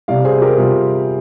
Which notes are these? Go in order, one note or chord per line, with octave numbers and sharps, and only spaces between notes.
C3 G3 D5 F5
G#4 C5
G4 A#4
C3 G3 F4 G#4